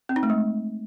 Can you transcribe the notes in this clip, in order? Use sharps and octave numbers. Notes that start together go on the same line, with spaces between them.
C4
D#4
A3
G#3